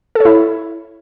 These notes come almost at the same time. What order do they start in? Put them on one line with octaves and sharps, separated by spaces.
A4 C#5 E4